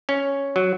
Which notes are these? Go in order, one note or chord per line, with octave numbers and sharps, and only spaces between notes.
C#4
F#3